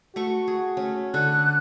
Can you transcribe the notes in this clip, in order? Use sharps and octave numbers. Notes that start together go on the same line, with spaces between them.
A3 F#4 A4 C#6
G#4
A3 C#4
D3 A4 C#6 F#6